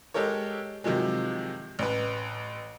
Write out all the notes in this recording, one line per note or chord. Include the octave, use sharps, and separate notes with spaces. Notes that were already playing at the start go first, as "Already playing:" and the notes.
G#3 G4 A4 A#4 C#5
C3 D#3 F3 F#3 G#3
A1 B4